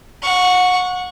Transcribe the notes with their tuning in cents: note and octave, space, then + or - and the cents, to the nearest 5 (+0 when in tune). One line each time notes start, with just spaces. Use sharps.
F#5 -30 C#6 +0